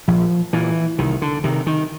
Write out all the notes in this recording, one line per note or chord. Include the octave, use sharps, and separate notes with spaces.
A#1 F3
A#2 E3
C2 D#3
D3
C3 D#3
D#3